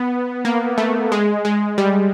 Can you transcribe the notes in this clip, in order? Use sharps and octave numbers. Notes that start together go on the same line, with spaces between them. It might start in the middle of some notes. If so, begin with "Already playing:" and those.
Already playing: B3
A#3
A3
G#3
G#3
G3